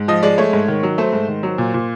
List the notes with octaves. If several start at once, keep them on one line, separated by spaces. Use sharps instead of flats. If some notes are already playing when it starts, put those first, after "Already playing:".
Already playing: G#2
F3 D#5
G#3 D5
A3 C#5
G#2
D#3
F#3
A3 C5
G#2
D#3
F#3
A#2
A#2